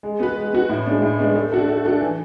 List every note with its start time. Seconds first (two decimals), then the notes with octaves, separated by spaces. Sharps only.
0.03 G#3
0.20 B3 F#4 B4
0.37 G#3
0.53 B3 F#4 B4
0.70 A2
0.86 G#3 B3 D4
1.02 A2
1.19 G#3 B3 D4
1.35 A3
1.52 D4 F#4 A4
1.68 A3
1.85 D4 F#4 A4
2.01 E3